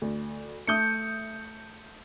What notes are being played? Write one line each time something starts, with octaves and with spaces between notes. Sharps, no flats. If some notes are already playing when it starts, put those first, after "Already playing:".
D2
A3 E5 D#6 G6 C#7